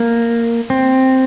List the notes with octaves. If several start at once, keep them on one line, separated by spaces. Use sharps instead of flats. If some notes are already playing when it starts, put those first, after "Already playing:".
Already playing: A#3
C4